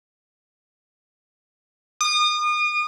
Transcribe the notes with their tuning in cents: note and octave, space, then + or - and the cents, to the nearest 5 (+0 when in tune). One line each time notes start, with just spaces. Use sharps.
D#6 -35